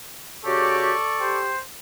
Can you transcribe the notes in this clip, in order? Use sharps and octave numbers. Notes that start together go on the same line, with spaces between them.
C#3 F#4 G4 A4 D5 C#6
G4 C5